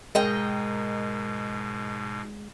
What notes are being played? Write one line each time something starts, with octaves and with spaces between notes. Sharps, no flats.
G#2 B2 G#3 A#4 D#5 G5